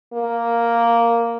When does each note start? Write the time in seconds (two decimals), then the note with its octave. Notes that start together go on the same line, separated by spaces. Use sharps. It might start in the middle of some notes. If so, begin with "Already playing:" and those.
0.13 A#3